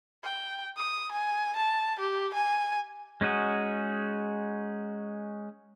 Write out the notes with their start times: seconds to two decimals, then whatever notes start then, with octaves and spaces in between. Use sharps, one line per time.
0.24 G5
0.77 D#6
1.12 G#5
1.56 A5
1.99 G4
2.34 G#5
3.21 G#3 C#4 D#4 F#4 G#4